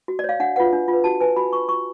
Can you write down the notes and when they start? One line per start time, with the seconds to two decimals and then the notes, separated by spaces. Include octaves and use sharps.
0.08 F#4
0.19 D5
0.24 C#5 F5
0.40 D4 F#5
0.56 F4 B4 F#5
0.73 D4
0.88 F4
0.93 B4
1.04 F#4 A5
1.21 B4 G#5
1.36 F#4 B5
1.53 B4 C#6
1.69 F4 C#6